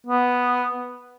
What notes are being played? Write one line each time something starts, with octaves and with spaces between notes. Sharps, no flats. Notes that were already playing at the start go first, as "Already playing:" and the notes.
B3